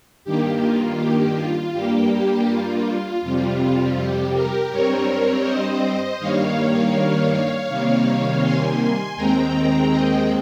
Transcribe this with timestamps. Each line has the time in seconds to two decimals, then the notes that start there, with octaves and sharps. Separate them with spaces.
0.25 G2 D#3 A#3 G4
0.62 F4
0.99 G4
1.36 F4
1.73 G2 G3 A#3 G4
2.11 G4
2.48 F4
3.22 F2 C3 G3 F4
3.97 G4
4.34 G4 A#4
4.71 G2 G3 C4 A#4 C#5
5.45 C5 D#5
6.19 G2 D#3 G3 A#3 C#5 F5
7.68 C3 D#3 G3 A#3
8.42 G#5 C6
9.17 D#2 D#3 G#3 C4 G5 A#5
9.91 D#5 G5